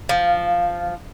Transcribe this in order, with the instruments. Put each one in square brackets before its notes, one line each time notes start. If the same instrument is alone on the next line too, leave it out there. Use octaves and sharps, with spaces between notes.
[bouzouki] F3 [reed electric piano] F5